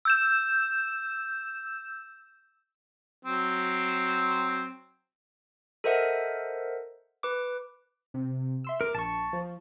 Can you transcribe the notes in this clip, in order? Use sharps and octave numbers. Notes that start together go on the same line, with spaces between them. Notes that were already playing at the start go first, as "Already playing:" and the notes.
E6 G6 E7
F#3 C4
A4 A#4 C5 D#5 E5 F#5
B4 D6
C3
E5 C6 E6
A#4 D6
A#1 A5 C#6
F3